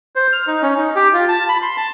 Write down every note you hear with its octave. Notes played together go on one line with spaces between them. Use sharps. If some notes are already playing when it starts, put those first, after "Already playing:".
C5
F6
D#4
C#4
D#4
G4
F4
A5
B5
C6
A5